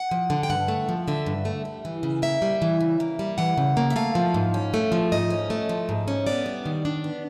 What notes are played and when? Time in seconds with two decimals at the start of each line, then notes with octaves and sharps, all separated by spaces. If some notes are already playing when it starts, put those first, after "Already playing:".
Already playing: F#5
0.11 F3
0.30 D3
0.43 G5
0.50 G2 F#5
0.68 A3
0.89 F3
1.08 D3 E5
1.26 G2
1.45 A3
1.65 G3
1.85 E3
2.03 C#3
2.22 A#3 E5
2.42 G3
2.62 E3
2.81 C#3
3.00 A#3
3.19 G3
3.38 E3 F#5
3.57 C#3
3.77 A#3
3.90 E5
3.96 A3 F5
4.15 F3
4.34 G#2
4.54 C#4
4.74 A3
4.92 F3
5.12 G#2 D#5
5.30 C#4
5.50 A3
5.69 F3
5.89 G#2
6.08 C#4
6.27 B3 D5
6.46 G3
6.66 D#3
6.85 D4
7.04 B3